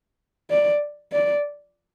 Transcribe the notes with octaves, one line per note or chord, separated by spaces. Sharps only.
D5
D5